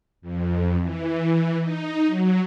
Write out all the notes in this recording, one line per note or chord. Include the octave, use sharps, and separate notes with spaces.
F2
E3
D#4
F#3